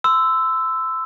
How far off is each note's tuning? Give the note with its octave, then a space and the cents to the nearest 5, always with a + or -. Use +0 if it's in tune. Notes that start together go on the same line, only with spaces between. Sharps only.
C6 -30 E6 +0